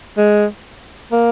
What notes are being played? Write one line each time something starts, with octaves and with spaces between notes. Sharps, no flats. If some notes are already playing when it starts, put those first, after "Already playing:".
G#3
A#3